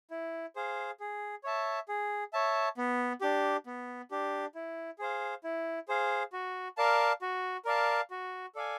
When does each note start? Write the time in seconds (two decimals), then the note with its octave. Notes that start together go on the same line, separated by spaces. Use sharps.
0.11 E4
0.56 G#4 C5 F5
1.00 G#4
1.44 C#5 E5 A5
1.88 G#4
2.33 C#5 E5 A5
2.77 B3
3.21 D4 G4
3.66 B3
4.11 D4 G4
4.55 E4
4.99 G#4 C5 F5
5.44 E4
5.88 G#4 C5 F5
6.33 F#4
6.77 A#4 D5 F5 A5
7.22 F#4
7.65 A#4 D5 F5 A5
8.11 F#4
8.55 A4 D5 F5 G#5